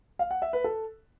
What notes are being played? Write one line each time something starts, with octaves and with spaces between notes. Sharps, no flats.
F5
F#5
E5
B4
A4